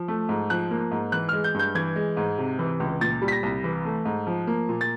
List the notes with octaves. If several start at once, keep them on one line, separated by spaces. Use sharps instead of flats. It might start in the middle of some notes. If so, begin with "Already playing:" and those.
Already playing: F3
A3
G#2
F3 F#6
A#3
G#2
E3 F#6
G#3 F6
G6
G2 G6
E3 G#6
G#3
G#2
C3
E3
C#2
A#2 A6
G3
B6
A#6
C2
E3
A3
G#2
F3
A#3
A#2
A6